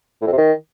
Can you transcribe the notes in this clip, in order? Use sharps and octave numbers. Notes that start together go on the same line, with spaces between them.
A2
F2
C3
D#3